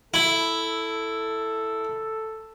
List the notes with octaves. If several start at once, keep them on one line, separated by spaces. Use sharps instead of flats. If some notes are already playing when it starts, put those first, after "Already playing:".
E4 A4